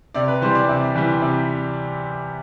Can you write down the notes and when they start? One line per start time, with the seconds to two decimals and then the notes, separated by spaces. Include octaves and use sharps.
0.14 C3 D5
0.28 B4
0.41 E3 G3 C5
0.55 D5
0.68 C3
0.95 E3 G3
1.22 C3